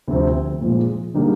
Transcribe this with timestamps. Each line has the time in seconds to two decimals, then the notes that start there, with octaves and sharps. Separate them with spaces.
0.08 D2 C3 F3 C4
0.61 A#2 F3 G#3
1.14 D3 G3 A#3 D#4 G#4